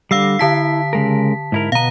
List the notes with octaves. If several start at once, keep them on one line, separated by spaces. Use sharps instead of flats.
D3 G3 F5 E6 C7
D3 E4 A5 B6
C#3 G#3 A#4
G#2 E4 A#4
B2 B3 F5 A#5